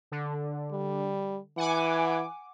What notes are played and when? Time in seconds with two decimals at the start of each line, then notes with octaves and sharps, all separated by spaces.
0.12 D3
0.71 G3
1.57 E3 F#5 G#5 D6